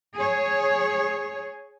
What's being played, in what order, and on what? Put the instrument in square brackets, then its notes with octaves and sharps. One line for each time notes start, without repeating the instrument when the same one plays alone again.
[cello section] G#4 C#5